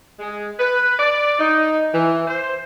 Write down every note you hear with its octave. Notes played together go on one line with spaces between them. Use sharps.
G#3
B4
D5
D#4
E3
C5